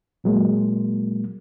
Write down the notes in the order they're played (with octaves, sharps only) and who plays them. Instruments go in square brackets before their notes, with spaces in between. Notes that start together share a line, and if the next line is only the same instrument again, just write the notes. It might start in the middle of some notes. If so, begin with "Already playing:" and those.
[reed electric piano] A#2 F#3 G#3 A#3